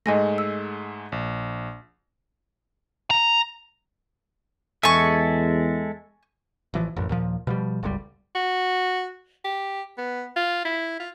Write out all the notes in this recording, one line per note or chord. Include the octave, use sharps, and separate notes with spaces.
G#2 G#3 A3 D#5 G#5 A#6
E6
A#1
A#5
E2 G#3 A4 E5 G#5 C#6
A1 E3 F3
A1 F#2
D#2 A#2 F3
B2 F3 G3
G1 C#2 C3 G3
F#4
G4
B3
F4
E4
F4